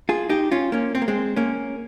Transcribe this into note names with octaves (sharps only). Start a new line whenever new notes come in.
F4 G#4
D#4 G4
C#4 F4
A#3 C#4
C4
A#3
G#3 C4
A#3 C#4